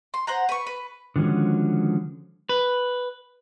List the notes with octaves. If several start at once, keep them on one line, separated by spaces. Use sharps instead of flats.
C6
C5 F#5 A#5
B4 C#6
B4
D3 D#3 F3 G#3 C#4 F#4
B4